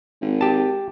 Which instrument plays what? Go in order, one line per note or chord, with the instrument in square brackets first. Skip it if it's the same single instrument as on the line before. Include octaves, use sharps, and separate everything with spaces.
[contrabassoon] G#1
[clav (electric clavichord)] G4 A5